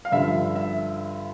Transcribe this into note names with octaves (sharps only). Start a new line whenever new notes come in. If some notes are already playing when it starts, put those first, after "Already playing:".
F5
G2 D3 F3 E5
E5